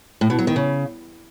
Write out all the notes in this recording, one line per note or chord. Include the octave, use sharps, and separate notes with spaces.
A2
B2
F#3
D#3
C#3